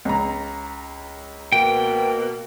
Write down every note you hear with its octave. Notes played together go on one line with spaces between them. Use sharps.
C#2 A#5
B2 A#3 G5